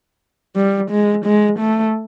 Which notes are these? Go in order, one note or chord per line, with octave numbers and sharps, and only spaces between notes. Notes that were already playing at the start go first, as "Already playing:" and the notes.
G3
G#3
G#3
A3